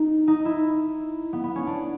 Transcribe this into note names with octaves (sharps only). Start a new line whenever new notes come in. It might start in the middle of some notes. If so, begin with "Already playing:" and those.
Already playing: D#4
D#4
E4
B3
B3
C#4
D4